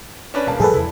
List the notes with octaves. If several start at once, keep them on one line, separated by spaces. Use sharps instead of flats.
C#4 D4 B4
E1 A#3 A5
A2 F3 G3 G#4 A4 B4
E2 C3 E4